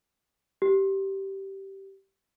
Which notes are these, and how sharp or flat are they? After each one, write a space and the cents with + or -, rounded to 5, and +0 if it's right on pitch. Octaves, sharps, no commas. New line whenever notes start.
G4 -15